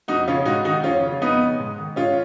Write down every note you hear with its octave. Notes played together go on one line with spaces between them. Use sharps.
F2 D#4 F#4
C#3 C#4 F4
G#2 D#4 F#4
D#3 D#4 F#4
F2 C#4 F4
C#3
F2 B3 D#4
C#3
G#2
D#3
G#2 C#4 F4